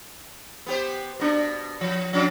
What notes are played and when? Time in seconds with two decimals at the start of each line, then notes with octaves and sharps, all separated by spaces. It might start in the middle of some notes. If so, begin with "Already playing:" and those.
0.66 B3 G4 C5
1.20 B2 D4
1.81 F3
2.13 F3 C#4 D4